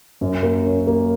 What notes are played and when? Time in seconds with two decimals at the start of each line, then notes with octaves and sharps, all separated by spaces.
0.21 F#2
0.43 A#3
0.66 C#4
0.87 A#3